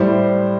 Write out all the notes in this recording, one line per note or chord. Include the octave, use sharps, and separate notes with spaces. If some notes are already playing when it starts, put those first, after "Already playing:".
Already playing: A2 G3 C5